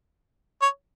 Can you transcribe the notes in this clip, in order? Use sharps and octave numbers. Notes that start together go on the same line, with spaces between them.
C#5